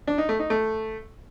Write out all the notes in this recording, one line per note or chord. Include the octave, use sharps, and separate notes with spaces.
D4
D#4
A3
D#4
A3